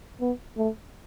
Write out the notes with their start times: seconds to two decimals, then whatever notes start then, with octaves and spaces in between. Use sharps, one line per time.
0.21 B3
0.58 A3